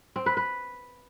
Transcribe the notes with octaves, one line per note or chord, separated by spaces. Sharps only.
C4
B4
B4